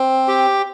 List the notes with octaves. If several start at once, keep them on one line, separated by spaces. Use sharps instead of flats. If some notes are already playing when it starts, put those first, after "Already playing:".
Already playing: C4
G4